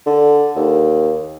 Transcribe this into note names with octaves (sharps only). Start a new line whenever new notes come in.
D3
D#2